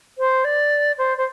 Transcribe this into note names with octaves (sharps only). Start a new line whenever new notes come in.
C5
D5
C5
C5